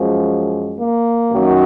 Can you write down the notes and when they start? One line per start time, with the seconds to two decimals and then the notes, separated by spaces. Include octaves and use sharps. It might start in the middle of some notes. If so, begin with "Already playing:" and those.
Already playing: F#2 F3 G#3
0.79 A#3
1.30 F#2 D#3 F#3